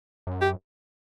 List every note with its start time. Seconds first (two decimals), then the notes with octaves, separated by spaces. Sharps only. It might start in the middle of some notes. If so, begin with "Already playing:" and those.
0.27 F#2
0.41 G4